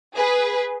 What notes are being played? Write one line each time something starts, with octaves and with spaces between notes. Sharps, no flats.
G#4 B4